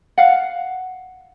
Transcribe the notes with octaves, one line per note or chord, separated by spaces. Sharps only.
F5 F#5